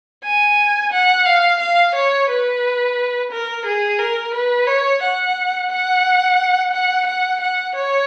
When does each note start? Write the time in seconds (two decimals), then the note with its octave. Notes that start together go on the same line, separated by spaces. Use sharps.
0.24 G#5
0.92 F#5
1.26 F5
1.60 F5
1.95 C#5
2.29 B4
3.32 A#4
3.66 G#4
3.99 A#4
4.34 B4
4.67 C#5
5.02 F#5
5.70 F#5
6.73 F#5
7.07 F#5
7.40 F#5
7.75 C#5